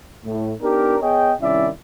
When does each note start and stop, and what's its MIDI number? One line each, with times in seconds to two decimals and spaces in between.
0.25 0.53 45
0.61 0.95 59
0.61 0.95 62
0.61 0.95 63
0.61 0.95 67
0.61 0.95 70
1.01 1.32 59
1.01 1.32 68
1.01 1.32 73
1.01 1.32 75
1.01 1.32 79
1.41 1.69 36
1.41 1.69 51
1.41 1.69 61
1.41 1.69 64
1.41 1.69 74
1.41 1.69 76